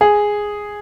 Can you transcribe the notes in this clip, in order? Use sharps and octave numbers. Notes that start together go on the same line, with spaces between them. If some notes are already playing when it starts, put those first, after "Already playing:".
G#4